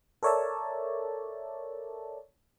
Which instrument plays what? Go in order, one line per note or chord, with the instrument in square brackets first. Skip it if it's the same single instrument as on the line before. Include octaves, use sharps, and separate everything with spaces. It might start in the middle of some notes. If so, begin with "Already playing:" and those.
[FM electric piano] A4 A#4 C#5 D5 E5 A5